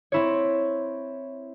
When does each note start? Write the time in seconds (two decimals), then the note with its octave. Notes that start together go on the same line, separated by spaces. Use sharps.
0.12 C4 E4 C#5